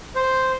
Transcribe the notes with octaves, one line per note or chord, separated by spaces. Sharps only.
C5